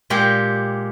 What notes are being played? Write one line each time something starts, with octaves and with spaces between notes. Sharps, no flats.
A#2 G#3 G4